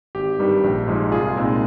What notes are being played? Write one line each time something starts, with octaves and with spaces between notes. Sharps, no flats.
G#1 G4
G2 D#3 G3
A#1
G#2 F3 G#3
C2 F4 G#4
A#2 G#3 C4 D#4